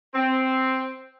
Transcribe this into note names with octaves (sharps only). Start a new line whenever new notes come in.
C4